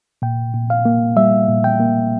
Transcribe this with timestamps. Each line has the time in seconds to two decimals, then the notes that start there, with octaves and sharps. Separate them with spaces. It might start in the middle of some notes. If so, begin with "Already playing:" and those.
0.22 A#2 G5
0.53 A#2
0.70 F5
0.85 A#3
1.16 G3 E5
1.48 A#2
1.64 G5
1.80 A#3